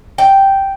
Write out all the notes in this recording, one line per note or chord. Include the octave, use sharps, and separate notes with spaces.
G5